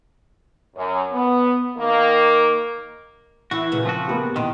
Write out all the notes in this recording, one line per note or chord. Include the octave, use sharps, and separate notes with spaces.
F#2
B3
D#3 A#3
E3 E4 F#4
A#2 C#3 B4
F3 C4 F#4
A#3 B3 G4
E2 B2 D#3 C6